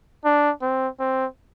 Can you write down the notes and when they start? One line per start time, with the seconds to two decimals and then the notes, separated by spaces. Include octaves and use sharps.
0.25 D4
0.62 C4
0.99 C4